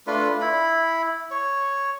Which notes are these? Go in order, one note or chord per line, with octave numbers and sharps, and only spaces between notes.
A3 D4 F4 B4
E4 B5
C#5